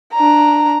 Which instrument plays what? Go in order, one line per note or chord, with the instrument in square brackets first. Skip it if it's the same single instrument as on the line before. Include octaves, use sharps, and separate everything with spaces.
[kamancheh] D4 A#5